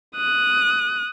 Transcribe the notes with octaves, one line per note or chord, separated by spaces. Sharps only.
D#6 F#6